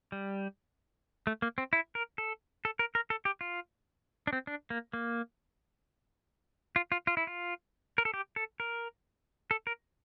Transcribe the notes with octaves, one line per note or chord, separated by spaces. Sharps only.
G3
A3
A#3
C4
E4
A#4
A4
A4
A#4
A#4
A4
G4
F4
D4
C4
D4
A#3
A#3
F4
F4
F4
E4
F4
A#4
A4
G4
A4
A#4
A4
A#4